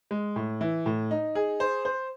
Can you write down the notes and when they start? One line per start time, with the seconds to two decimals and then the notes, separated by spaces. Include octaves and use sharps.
0.11 G#3
0.36 A2
0.61 E3
0.86 A2
1.11 D#4
1.35 G#4
1.60 C5
1.85 C5